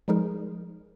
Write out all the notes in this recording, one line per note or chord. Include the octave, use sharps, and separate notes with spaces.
F3 G3 G#3 D#4 G#4 A#4